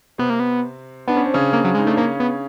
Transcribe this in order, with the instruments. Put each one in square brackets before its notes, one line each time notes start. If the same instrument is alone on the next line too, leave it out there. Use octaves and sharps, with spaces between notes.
[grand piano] C3 C4 [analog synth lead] B3
[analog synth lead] A#3
B3
[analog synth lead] B3 [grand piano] D4
[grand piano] C#4
C4
C#3 C#4
[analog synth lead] A#3
F#3
G#3
[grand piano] D#4
[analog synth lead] A3 [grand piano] D4
[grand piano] C#3 C#4 [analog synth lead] A#3
[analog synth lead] B3